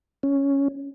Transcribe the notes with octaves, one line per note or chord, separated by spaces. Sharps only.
C#4